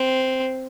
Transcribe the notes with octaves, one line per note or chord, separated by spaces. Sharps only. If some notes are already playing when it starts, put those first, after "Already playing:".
Already playing: C4